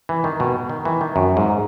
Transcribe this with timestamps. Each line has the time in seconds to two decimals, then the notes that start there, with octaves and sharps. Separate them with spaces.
0.09 E3
0.24 D#3
0.40 B2
0.69 D#3
0.85 E3
1.01 D#3
1.16 F#2
1.37 G#2